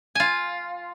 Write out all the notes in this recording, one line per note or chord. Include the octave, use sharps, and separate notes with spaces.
F4 G#5